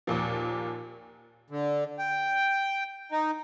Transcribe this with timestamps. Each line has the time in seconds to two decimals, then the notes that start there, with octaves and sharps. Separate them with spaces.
0.07 D#2 A#2 F3
1.50 D3
1.99 G5
3.12 D#4